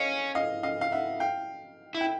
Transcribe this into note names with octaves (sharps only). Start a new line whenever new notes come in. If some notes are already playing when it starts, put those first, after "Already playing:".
Already playing: C#4 D#5 F5
D#5 F5
D#5 F5
F5
E5 F#5
F5 G5
E4
G5